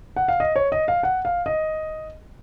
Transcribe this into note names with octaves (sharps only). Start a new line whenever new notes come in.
F#5
F5
D#5
C#5
D#5
F5
F#5
F5
D#5